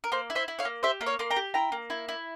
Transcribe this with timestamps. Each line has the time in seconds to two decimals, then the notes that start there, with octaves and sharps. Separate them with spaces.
0.04 A#4
0.12 A#3 C5
0.30 E4
0.35 C5 E5
0.48 E4
0.59 C#5 F5
0.65 A#3
0.83 G4 C5 E5
1.01 A#3 E5
1.06 C#5 F5
1.19 A#3 C6
1.31 G5 A#5
1.36 G4
1.54 E4 G5 A#5
1.72 A#3
1.90 E4
2.09 E4